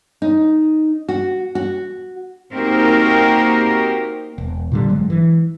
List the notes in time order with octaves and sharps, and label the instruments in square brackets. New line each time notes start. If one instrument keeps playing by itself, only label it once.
[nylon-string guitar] D#4
F#4
F#4
[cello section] A#3 C4 D#4 F#4 G4 A#4
[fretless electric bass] E1
A#2 D3 G3
G#1 F#3 G#3
E3